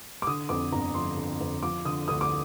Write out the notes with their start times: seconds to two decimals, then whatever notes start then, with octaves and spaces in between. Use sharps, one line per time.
0.22 D6
0.27 D3 D#6
0.49 F2 D6
0.72 G1 A#5
0.94 F3 C6
1.17 D3
1.41 F2
1.63 F3 D6
1.85 D3 D#6
2.08 D2 D#6
2.21 D6